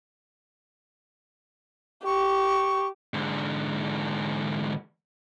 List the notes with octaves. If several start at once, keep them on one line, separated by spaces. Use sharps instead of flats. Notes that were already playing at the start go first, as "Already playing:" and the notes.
G4 C#6
G#2 D3